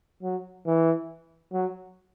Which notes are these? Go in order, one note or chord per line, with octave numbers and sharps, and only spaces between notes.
F#3
E3
F#3